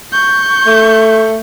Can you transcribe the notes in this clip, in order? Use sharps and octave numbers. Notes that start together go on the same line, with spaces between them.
C#6 G6
A3